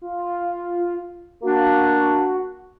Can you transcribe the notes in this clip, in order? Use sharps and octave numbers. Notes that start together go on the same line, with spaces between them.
F4
A#3 D4 F#4